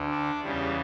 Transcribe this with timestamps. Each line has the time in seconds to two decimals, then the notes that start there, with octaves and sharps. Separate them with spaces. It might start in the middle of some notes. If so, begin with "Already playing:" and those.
Already playing: D2 D3
0.11 D4
0.44 E2 C#3 E3 G3